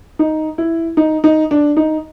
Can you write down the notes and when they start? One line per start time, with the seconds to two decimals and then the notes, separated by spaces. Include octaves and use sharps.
0.19 D#4
0.58 E4
0.97 D#4
1.24 D#4
1.51 D4
1.77 D#4